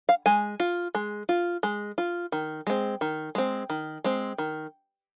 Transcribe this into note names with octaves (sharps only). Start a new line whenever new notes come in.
F5
G#3 G#5
F4
G#3
F4
G#3
F4
D#3
G#3 C4
D#3
G#3 C4
D#3
G#3 C4
D#3